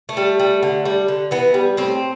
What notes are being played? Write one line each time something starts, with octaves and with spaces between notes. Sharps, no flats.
A3
G3
G3
D3
G3
D3
E3 B3
G3
A2 C4